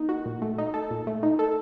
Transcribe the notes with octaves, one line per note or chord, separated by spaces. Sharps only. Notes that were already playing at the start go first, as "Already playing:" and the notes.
Already playing: A#3 D#4
F#4
A#2
A3
D#4
A4
A#2
A3
D#4
A4